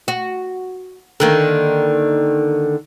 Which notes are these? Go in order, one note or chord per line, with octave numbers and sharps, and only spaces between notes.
F#4
D3 D#3 A#3